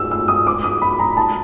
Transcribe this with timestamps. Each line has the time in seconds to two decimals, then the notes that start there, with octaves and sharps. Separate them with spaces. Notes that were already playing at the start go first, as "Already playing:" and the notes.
Already playing: E6
0.11 E6
0.28 D#6
0.47 D6
0.64 D#6
0.82 B5
0.99 A#5
1.17 A5